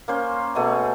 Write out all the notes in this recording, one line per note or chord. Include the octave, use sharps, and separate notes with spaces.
A#3 C#4 C5
B2 A3 G#4 D#5